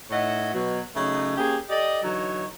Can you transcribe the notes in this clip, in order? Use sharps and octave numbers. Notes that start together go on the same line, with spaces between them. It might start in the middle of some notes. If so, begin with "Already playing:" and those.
A2 D#4 C#5 D#5 E5 F#5
B2 F#3
C#3 F#3 A3 C#4 D#4
A#3 C#4 G4 G#4
G4 A4 D5 D#5
D3 E3 F#3 D#4 C#5 A#5